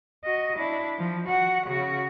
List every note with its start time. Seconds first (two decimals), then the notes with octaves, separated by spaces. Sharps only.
0.24 F#4 D#5
0.57 D4 E4
0.99 F3
1.28 F#4 F#5
1.67 C#3 F#4